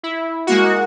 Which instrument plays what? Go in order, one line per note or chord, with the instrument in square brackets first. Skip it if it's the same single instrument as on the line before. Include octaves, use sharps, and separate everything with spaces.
[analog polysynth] E4
G#3 A#3 F#4